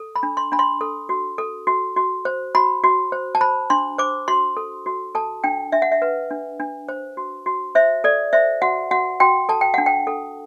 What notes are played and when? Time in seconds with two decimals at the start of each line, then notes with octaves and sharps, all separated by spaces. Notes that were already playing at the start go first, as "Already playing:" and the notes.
Already playing: A4
0.16 B5
0.23 D4
0.37 C6
0.52 D4 B5
0.59 C6
0.81 A4
1.09 F#4
1.38 A4
1.67 F#4
1.96 F#4
2.25 C5
2.55 F#4 B5
2.84 F#4
3.12 C5
3.35 A5
3.41 C5 B5
3.70 D4 C6
3.98 C5 D6
4.28 F#4 C6
4.57 A4
4.86 F#4
5.15 A4 A5
5.44 D4 G5
5.72 D4 E5
5.82 F#5
5.92 E5
6.02 B4
6.31 D4
6.60 D4
6.89 C5
7.17 F#4
7.46 F#4
7.75 C5 E5
8.04 A4 D5
8.33 C5 E5
8.62 F#4 F#5
8.91 F#4 F#5
9.20 F#4 G5
9.49 A4 A5
9.61 G5
9.74 D4 F#5
9.86 G5
10.07 A4